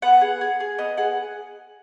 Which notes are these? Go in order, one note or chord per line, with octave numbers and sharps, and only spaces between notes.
B3 F#5
G#4
G#4
G#4
B3 D#5
G#4 F#5